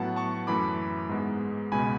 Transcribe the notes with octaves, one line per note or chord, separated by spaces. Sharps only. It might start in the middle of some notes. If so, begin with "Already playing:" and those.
Already playing: A2 F#3 B3 F#5 A5
A5 C#6
F#2 E3 A3 B5 D6
G#2 G#3 B3
C#2 B2 G#3 B3 G#5 B5